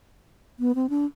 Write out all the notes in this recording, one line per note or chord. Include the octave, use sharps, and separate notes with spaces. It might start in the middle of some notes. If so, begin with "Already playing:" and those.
B3
C4
D4